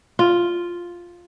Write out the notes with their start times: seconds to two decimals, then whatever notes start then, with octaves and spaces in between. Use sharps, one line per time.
0.19 F4